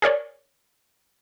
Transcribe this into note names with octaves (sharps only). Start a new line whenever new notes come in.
G#4 A#4 C#5 D5